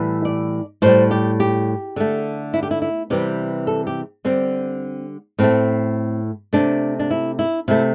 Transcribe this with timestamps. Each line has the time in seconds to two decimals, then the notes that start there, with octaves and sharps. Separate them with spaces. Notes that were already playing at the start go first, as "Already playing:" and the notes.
Already playing: A2 E3 G3
0.25 D5
0.82 A2 G3 C5
1.11 G4
1.40 G4
1.96 D3 A3
2.54 E4
2.63 G4
2.71 E4
2.82 E4
3.10 C3 E3 G3 G4
3.67 A4
3.87 G4
4.25 D3 G3 C4
5.39 A2 A3 C4
6.53 C3 A3 D4
6.99 D4
7.10 E4
7.39 E4
7.68 C3 A3 E4